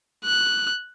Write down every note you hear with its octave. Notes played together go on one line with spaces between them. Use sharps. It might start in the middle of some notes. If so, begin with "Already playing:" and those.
F#6